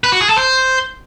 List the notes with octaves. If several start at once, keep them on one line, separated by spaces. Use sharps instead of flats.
B4
F#4
G#4
A4
C5